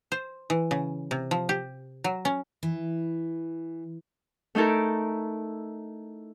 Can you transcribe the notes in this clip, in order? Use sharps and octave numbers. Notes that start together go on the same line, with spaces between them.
C5
E3
C#3
C3
F3
G4
F#3
C#4
E3
A3 D#4 E4 A4 A#4